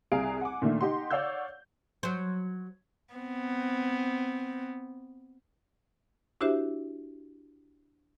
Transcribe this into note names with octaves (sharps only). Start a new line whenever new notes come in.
C2 G#4 F5 A#5 D7
F#5 G#5 D6
A#2 D#3 A3 D4
D#4 G4 F#5 C6
C#5 D5 F5 F#5 E6 G6
F#3 C5
B3 C4
D4 E4 F#4 G4 C5 E5